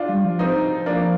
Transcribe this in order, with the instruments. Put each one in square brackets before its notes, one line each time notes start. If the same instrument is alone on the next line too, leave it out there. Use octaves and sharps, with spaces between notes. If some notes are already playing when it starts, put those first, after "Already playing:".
Already playing: [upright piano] D4 F4
[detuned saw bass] G3
F3
[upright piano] C4 D#4
A#3 D4